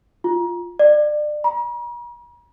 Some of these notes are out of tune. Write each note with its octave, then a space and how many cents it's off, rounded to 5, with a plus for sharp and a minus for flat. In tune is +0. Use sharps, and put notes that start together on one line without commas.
F4 +0
D5 +30
A#5 +45